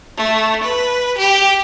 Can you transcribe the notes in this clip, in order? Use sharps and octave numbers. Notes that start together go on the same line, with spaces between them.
A3
B4
G4